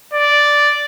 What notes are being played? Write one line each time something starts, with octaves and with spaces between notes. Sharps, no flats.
D5